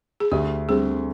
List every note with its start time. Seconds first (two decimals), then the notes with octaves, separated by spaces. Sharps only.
0.20 G#4
0.32 D2 G4
0.69 D3 G3 C4 G#4